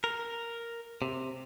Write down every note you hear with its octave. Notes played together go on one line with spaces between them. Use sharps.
A#4
C3